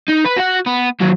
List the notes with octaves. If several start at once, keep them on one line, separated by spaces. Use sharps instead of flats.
D#4
B4
F#4 F#5
B3
D#2 F#3